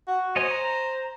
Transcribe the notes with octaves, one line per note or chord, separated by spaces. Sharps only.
F#4
C5 C#5 D#5 G#5
A#5